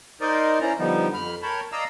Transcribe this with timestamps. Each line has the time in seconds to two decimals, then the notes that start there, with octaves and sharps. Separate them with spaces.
0.21 D#4 A#4 C5 D5 D#5
0.61 C#4 E4 C5 D5 A#5
0.79 D3 F3 G3 B3 D#4
1.14 F2 B5 F6
1.42 A#4 C#5 G5 A5 B5
1.72 D5 D#5 F5 A#5 E6